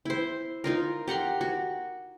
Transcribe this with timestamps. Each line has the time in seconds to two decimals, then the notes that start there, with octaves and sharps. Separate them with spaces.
0.05 E4 C5
0.64 D#4 F4 A#4
1.08 G4 F#5 A#5 C6
1.41 F#4